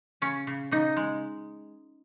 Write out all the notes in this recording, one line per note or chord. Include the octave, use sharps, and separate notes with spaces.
C#3 C#4
C#3
C#3 D#4
G#3